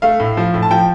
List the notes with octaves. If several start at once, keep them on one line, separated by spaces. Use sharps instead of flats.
A3 F5
A2
F3
A2
A5
F3 G5